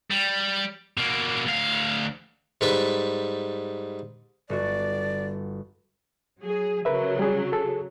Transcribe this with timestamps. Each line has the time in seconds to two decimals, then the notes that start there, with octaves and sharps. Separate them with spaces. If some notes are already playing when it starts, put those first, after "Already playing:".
0.11 G3
0.97 B2 A#3
1.46 D2 F5
2.61 G#2 G3 A4 B4 C#6
4.49 G1 F#4 D5
6.40 F#3 G#4
6.85 C#3 F#3 A#4 B4 E5
7.19 G3 G#4
7.52 G#4 A4